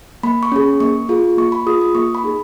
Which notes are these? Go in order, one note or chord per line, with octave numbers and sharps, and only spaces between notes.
A#3 B5
C#6
C#4 G#4
A#3 C#6
F4 G#4
A#3 C#6
B5
F4 G#4 D#6
D#6
A#3 C#6
B5
D#4 G#4